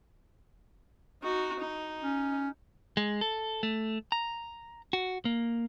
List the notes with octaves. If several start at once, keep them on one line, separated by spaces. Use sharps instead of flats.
D#4 F#4
D#4
C#4
G#3
A4
A3
A#5
F#4
A#3